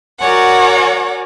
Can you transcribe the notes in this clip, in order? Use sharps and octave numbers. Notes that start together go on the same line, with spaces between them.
F#4 A#4 C#5 D5 F#5 G#5